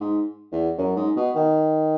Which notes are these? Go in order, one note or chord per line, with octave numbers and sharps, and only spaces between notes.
G#2
E2
F#2
G#2
B2
D#3